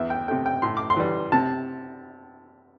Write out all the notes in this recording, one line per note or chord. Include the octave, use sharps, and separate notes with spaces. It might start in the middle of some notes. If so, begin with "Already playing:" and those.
Already playing: E2 E5
G5
C3 A3 G5
G5
A2 C6
D6
C6
E3 G3
C3 A5